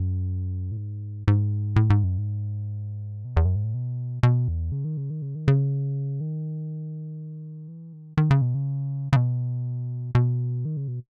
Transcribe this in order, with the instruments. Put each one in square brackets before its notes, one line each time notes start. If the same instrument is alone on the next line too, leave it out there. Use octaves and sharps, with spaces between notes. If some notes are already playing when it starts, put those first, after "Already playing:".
Already playing: [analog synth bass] F#2
A2
G#2
G#2
A2
G#2
F#2
G#2
B2
E2
F#2
G#2
A2
B2
B2
E2
C#3
D#3
C#3
D#3
C#3
D#3
C#3
D#3
E3
D#3
D#3
C#3
B2
C#3
C#3
B2
B2
D#3
C#3
B2